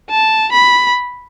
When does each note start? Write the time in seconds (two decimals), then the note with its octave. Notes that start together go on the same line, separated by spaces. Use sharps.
0.10 A5
0.52 B5